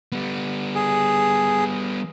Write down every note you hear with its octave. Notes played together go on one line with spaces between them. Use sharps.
G3 B3
G#4